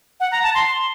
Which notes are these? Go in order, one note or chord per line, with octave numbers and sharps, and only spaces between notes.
F#5
A#5
A5
C6